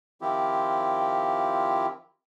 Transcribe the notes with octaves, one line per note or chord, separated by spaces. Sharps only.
D#3 F3 C4 E4 F4 G4